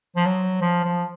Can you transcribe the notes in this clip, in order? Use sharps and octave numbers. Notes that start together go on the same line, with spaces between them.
F3
F#3
F3
F3